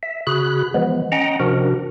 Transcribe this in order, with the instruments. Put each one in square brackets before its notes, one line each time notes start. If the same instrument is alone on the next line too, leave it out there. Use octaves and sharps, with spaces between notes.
[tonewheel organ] E5
C#3 F#4 G#4 B5 F#6
E3 F3 G#3 B3
C#4 D#5 F#5 G5 A#5
C3 F3 D4 F#4 A#4